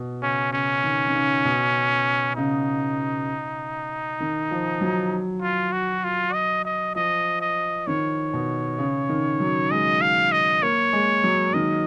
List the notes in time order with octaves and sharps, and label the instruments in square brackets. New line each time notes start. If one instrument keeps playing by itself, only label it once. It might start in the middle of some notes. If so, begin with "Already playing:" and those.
Already playing: [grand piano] B2
[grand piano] C#3 [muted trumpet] C#4
[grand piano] C#3 [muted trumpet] C#4
[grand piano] D#3
D#3
C#3
B2
[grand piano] C#3 [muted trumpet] D#4
[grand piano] D#3
F3
F#3
[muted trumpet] F4
F#4
F4
D#5
D#5
[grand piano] F3 [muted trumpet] D#5
[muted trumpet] D#5
[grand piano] D#3 [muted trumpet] C#5
[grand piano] B2
C#3
D#3
F#3
[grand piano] G#3 [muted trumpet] D#5
[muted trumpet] F5
D#5
[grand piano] A#3 [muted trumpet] C#5
[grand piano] G#3
F#3
[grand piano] D#3 [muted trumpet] D#5